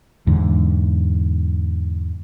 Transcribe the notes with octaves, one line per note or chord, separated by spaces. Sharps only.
E2 G#2 D3